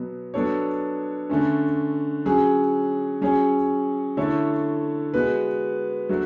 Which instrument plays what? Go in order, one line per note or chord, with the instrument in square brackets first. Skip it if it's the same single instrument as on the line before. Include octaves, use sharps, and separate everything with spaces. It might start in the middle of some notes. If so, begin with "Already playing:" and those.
Already playing: [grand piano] B2 F#3 B3
F#3 B3 D4 A4 C#5
D3 A3 C#4
F#3 C#4 G#4
F#3 C#4 G#4 C#5
D3 A3 E4 A4 C#5
G#3 B3 F#4 B4
F#3 A3 D4 F#4